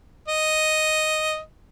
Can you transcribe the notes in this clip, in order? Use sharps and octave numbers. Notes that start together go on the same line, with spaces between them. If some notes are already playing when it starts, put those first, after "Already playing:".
D#5